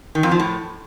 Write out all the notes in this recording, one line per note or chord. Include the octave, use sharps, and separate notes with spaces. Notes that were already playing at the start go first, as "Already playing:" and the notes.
D#3
F2
F3
A2